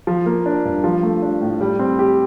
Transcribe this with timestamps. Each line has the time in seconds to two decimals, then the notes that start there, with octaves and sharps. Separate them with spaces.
0.07 F3
0.26 A#3
0.46 D4
0.65 G2
0.84 F3
1.03 A3
1.22 D4
1.41 A2
1.61 G3
1.79 C4
1.99 G4